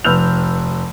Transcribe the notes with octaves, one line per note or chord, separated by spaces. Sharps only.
F1 B4 E6 F6 G6 F7